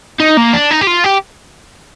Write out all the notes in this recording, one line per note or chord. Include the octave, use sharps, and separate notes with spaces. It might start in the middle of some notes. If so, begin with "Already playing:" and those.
D#4
A#3
D4
D#4
G4
F4
G4